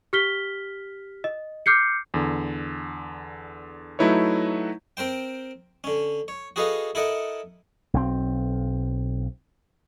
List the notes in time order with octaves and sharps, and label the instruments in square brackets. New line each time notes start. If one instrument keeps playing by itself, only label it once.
[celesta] G4 F6 B6 G7
D#5
D6 F6 G6 C7 C#7
[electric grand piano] E2 D3
F#3 A3 D#4 E4 B4 C#5
[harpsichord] C4 A#4 C5 G5
D3 C#4
C#5
F#4 G#4 A4 B4 D#5 F5
E4 A4 A#4 D#5 F#5
[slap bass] B1 C4